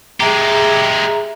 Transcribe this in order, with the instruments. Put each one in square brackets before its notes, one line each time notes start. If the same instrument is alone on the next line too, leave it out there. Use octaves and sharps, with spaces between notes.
[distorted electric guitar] G#3 G4 [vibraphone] G#4 E5 A#5